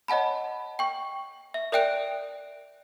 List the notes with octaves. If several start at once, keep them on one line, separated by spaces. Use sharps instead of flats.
C#5 D#5 F#5 A5 B5
G5 C#6
E5
A#4 D5 E5 G5 F#6 D7